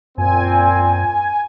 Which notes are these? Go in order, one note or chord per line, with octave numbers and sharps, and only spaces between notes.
F#2 A#2 C4 G#5